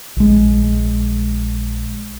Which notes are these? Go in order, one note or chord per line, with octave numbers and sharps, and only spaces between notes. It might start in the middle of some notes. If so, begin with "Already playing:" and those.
A#1 G#3